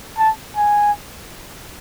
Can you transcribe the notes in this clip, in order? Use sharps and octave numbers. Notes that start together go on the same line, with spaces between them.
A5
G#5